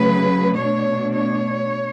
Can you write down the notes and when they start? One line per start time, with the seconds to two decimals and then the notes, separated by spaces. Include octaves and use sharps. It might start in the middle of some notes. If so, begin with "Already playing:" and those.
Already playing: C#3 F#3 A3 B4
0.57 B2 A3 D4 C#5
1.14 C#5